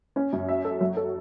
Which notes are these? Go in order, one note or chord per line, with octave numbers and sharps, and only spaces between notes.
C#4
F#2
E5
A4
F#3
A4